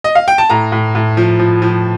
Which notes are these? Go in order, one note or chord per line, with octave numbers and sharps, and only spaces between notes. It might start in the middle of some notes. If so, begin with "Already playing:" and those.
D#5
F5
G5
A5
A2 A#5
A2
A2
F3
F3
F3